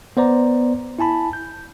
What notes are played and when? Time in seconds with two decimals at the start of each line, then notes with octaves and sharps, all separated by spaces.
0.17 B3 C5 D5 A#5
0.99 E4 G#5 A5 B5
1.33 G6